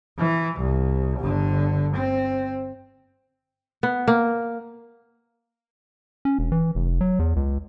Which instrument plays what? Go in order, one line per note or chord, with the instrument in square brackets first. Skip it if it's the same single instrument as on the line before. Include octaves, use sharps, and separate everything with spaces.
[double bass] E3
C2
G1 D3
C4
[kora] B3
A#3
[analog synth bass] C#4
E1
E3
F1
F#3
E2
C#2